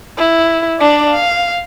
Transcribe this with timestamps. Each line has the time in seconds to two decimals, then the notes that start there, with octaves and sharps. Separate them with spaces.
0.17 E4
0.79 D4 D5
1.11 F5